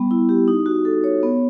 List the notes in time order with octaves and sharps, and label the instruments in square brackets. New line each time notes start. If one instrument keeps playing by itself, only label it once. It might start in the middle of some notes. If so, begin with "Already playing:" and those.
Already playing: [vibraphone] G3 B3
E4
G4
D#4
F#4
A4
C#5
B3